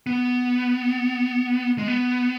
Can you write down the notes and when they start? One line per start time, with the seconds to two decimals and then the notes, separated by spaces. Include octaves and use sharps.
0.07 B3
1.78 G#3
1.88 B3